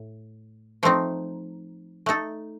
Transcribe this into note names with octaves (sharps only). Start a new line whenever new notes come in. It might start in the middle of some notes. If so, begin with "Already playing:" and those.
Already playing: A2
F3 A3 C4 D#4
A3 D#4 A4